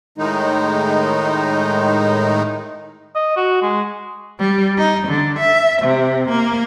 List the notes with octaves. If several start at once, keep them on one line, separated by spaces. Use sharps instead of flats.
A2 D#3 G#3 D#4
D#5
F#4
G#3
G3
D#4
D3
E5
C3
A#3